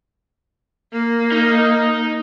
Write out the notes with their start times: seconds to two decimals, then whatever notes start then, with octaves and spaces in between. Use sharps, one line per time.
0.93 A#3
1.32 D#4